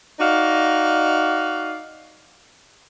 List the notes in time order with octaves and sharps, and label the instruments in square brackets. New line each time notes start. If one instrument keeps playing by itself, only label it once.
[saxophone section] D#4 F#4 D5 F5